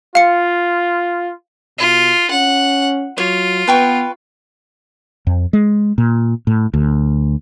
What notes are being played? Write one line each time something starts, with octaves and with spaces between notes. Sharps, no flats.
F4 F5 C#7
B2 F4
C#4 F#5
F#3 F4 C#5
B3 B4 G5 C#6
F2
G#3
A#2
A2
D2